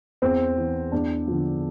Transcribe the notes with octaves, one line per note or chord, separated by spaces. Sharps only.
E2 C4
E3
E2 D4
D3 F3